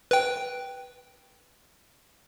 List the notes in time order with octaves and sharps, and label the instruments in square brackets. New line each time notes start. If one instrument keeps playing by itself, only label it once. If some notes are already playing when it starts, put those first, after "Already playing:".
[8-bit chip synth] B4 G5